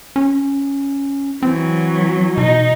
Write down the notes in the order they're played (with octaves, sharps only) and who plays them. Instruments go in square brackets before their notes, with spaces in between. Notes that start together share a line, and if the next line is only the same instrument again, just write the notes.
[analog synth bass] C#4
[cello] E3 F#3 [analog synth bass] C4
[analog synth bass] B2 [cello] D#4